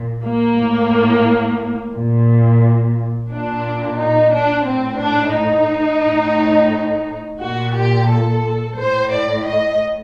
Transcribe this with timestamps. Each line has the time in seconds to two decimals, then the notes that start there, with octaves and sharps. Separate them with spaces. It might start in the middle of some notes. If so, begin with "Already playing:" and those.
Already playing: A#2
0.24 A#3
0.58 A2
1.94 A#2
3.31 A#2 D4
3.99 D#4
4.33 D4
4.67 A2 C4
5.01 D4
5.35 D#4
6.04 A2
7.40 A#2 F#4
7.74 G4
8.08 A4
8.76 A2 C5
9.11 D5
9.44 D#5